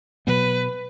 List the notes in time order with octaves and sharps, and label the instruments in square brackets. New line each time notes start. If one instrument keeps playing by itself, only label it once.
[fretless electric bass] B2 F#3 B3 [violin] B4